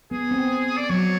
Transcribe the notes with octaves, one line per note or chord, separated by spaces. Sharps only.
B3 G#4
C4
D5
F#3 C#5